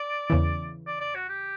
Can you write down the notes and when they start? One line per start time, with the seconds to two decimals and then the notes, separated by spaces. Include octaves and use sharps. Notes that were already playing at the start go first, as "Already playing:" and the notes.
Already playing: D5
0.30 E2 C#3 E3
0.87 D5
1.00 D5
1.15 F#4
1.29 G4